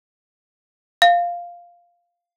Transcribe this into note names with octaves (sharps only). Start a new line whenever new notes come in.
F5